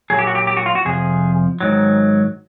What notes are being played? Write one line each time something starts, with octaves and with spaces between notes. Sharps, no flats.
A#2 F#3 G#4
G4
F#4
G4
G4
F#4
F4
F#4
F2 C3 F3 G#4
G#2 D#3 F#3